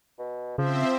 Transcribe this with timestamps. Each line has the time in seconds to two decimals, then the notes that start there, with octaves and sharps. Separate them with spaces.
0.19 B2
0.58 C#3 F3 C4 C5 E5